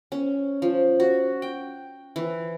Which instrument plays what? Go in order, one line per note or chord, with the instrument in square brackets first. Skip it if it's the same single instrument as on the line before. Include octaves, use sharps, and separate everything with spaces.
[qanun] C#4
F3
F#4
G5
E3